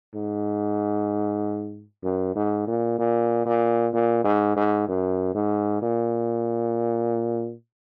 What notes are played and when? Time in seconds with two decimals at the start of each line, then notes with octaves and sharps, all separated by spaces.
0.14 G#2
2.03 F#2
2.36 G#2
2.68 A#2
2.99 A#2
3.46 A#2
3.93 A#2
4.24 G#2
4.57 G#2
4.89 F#2
5.35 G#2
5.82 A#2